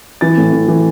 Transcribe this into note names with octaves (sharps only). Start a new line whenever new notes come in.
E3 A6
A2
E3
E3